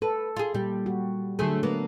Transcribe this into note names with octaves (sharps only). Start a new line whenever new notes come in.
A4 B4
F4 G#4
A#2 G3 G4
F#4
D3 F#3 A3 C4 G#4 A4
A#3 B3